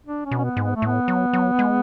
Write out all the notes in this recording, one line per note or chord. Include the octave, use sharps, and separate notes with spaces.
D4
C#4
B2
C#4
B3
G#2
B3
A3
A2 B3
F#3
F#3
G#3